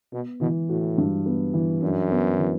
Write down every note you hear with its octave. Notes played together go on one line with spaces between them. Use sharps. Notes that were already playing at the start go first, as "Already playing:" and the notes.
B2 B3
B2 E3
A2 F#4
G2
B3
E3
F#2 D4
B3
E3